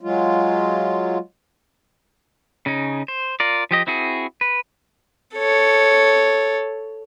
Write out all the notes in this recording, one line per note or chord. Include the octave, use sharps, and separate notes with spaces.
F#3 G#3 F4
C#3 C#4 D#4
C5
F4 A#4 D5
F3 G4 D#5
C4 E4 F#4 G#4
B4
A4 C#5